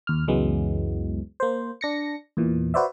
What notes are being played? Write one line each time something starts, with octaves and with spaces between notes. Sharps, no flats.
D#2 F6
C#2 F#2 E3 F#3 G#3 B3
A#3 C5
D4 A#6 C#7
E2 A#2 E3
F#4 B4 C5 D5 E5